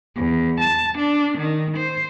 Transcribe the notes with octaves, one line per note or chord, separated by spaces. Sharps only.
E2
A5
D4
D#3
C5